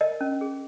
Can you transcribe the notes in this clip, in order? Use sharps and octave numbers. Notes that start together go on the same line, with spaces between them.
A#4 D#5
C#4
G#4